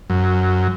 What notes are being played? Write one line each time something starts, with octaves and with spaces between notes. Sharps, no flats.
F#2